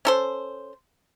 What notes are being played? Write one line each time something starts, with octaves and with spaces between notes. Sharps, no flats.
C#4 A4 C5